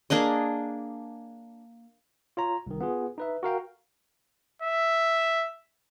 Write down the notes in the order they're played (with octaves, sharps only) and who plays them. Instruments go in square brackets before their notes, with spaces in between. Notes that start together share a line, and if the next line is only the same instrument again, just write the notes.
[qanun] A#3 D4 G#4 D#5
[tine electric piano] F4 C#5 A#5
C2 D#3
B3 F4 G#4
D#4 B4 E5
F#4 A#4 F5 G5
[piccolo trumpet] E5